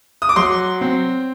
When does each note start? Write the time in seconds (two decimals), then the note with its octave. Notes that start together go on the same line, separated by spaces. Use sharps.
0.22 D#6
0.29 D6
0.36 F#3 C6
0.81 C4